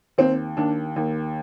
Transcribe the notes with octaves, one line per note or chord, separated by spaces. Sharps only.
D#2 C4
D#2 D4
D#2